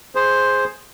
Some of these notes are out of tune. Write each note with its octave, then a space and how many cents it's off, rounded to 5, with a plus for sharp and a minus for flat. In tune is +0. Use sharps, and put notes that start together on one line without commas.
G#4 +0 C5 +5